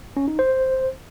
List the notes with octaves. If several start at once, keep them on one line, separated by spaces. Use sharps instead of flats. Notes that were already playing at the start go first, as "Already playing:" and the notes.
C#4
D#4
C5